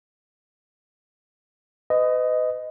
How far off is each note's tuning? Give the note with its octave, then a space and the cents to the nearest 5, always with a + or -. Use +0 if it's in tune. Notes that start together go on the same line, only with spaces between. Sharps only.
B4 +40 D#5 +0